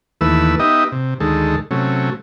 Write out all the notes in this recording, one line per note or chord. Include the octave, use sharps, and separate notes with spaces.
D#2 E3 A3 B4 E6
B3 D#4 G4 D#5 E5
C3
D2 D#3 G#3 A4
C3 F#3 A3 C#4